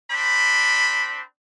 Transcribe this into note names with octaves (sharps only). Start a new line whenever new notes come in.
C4 D4 B5